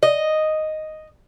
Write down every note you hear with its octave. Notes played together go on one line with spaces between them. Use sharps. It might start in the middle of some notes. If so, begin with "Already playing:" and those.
D#5